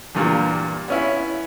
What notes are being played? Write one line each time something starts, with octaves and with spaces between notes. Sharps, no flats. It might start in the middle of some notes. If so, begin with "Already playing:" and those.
E2 G2 A#2 G3 A#3
B3 C#4 E4